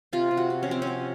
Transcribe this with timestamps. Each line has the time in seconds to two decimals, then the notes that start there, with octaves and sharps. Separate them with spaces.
0.13 C3 F4
0.31 C3
0.37 F#4
0.50 C3
0.63 C#4
0.68 F3 C4
0.82 C#4
0.87 C3